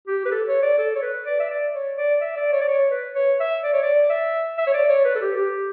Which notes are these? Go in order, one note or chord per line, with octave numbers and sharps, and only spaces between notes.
G4
B4
A4
C#5
D5
A4
C#5
B4
D5
E5
D5
C#5
D5
E5
D5
C#5
D5
C#5
B4
C#5
E5
D5
C#5
D5
E5
E5
C#5
D5
C#5
B4
A4
G4
G4